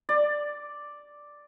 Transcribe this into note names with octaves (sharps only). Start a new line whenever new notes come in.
D5